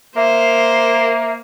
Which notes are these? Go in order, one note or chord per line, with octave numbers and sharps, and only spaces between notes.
A#3 C5 E5